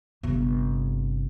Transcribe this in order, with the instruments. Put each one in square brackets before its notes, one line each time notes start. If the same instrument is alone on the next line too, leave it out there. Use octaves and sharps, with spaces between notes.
[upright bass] G1 C3